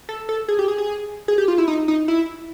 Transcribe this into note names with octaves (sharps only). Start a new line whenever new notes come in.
A4
A4
G#4
G4
G#4
G#4
G#4
G4
F4
E4
D#4
D#4
E4